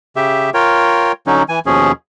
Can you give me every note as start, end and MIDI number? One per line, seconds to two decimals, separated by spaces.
0.16 0.50 49
0.16 0.50 67
0.16 0.50 76
0.54 1.12 65
0.54 1.12 70
0.54 1.12 73
0.54 1.12 79
1.27 1.43 50
1.27 1.43 54
1.27 1.43 61
1.27 1.43 63
1.49 1.59 52
1.49 1.59 80
1.66 1.92 39
1.66 1.92 47
1.66 1.92 53
1.66 1.92 61
1.66 1.92 68